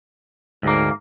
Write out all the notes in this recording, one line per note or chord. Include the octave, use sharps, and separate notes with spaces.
D2 G#2 A#3